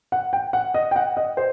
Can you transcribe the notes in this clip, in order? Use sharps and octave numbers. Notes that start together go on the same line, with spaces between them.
F#5
G5
F#5
D#5
G5
F#5
D#5
C5